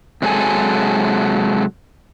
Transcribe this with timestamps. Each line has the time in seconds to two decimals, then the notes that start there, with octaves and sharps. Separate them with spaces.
0.22 C3 F#3 G#3 A4 G#5